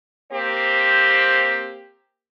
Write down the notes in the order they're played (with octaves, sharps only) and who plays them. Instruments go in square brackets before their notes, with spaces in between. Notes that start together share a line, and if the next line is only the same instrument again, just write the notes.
[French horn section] A#3 C4 G4 C5